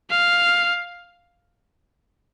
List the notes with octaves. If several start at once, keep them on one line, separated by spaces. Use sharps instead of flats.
F5